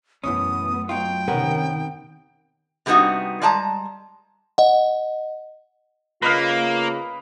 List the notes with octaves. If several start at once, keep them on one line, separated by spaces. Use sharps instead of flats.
F#2 B2 E3 A3 B3 C#4 D#6
F#3 D#4 F4 G5
C3 D#3 B3 C#4 A#4
C3 G3 A3 B3 D#4 F#4
G3 G#3 A5 A#5
D#5 F#5
C#3 A#3 F4 B4 D#5 F5